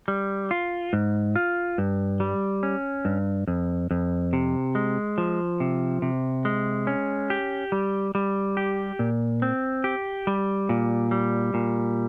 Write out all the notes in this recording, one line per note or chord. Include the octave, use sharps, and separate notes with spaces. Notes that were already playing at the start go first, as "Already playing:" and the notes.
G3
F4
G#2
F4
G2
G3
C#4
G2
F2
F2
C3
G#3
F3
C3
C3
G#3
C#4
G4
G3
G3
G4
A#2
C4
G4
G3
A#2
G3
A#2